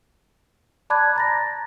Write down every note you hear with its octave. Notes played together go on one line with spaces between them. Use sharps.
D5 A5 B5 D6 F#6 G#6
A#5 A6 A#6